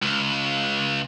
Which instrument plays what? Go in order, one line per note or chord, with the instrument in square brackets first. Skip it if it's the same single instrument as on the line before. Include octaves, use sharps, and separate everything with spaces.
[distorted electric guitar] C#2